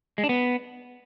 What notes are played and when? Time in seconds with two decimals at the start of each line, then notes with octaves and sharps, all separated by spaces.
0.18 G#3
0.24 D4
0.29 B3